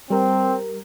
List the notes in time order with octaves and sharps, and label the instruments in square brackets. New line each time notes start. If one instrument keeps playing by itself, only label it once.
[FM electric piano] G3 A#4 [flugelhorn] C4